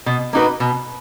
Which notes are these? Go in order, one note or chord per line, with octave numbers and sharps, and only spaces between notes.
B2
A#3 D#4 F#4 B4
B2